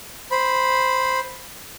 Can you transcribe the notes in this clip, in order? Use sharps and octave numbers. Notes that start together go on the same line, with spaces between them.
C5 B5